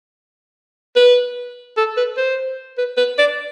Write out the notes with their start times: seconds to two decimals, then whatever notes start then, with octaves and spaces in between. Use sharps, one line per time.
0.96 B4
1.77 A4
1.97 B4
2.17 C5
2.78 B4
2.97 B4
3.19 D5